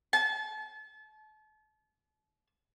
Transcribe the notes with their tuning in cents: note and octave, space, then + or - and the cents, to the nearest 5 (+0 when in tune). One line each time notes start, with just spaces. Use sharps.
A5 -35